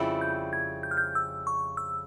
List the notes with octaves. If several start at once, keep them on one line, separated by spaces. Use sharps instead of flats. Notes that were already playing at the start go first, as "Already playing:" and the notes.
Already playing: F2 C#3 G3 C4 E4
G6
G#6
G6
F6
G6
E6
C#6
E6